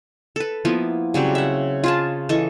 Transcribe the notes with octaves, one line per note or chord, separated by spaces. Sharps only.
A4 B4
F3 A#3 B3 E4
C#3 F#3 G3 C4
E5 F#5
F4 G#4 A5
E3 A4 D#5 C#6